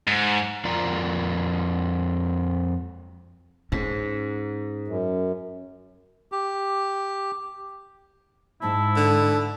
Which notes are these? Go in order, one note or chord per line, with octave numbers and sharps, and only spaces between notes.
G#2
F2 F4 A#4 D5 A#5
G#2 C#4
F#2
G4
G#2 E4 A5
D3